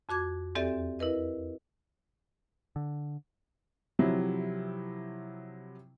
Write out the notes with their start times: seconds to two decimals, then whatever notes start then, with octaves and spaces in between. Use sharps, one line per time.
0.09 F2 F#4 D6 G#6
0.55 E2 C4 G4 A4 D5 E5
0.99 E4 A#4 B4 D#5
2.76 D3
3.99 C3 F3 F#3 C4 E4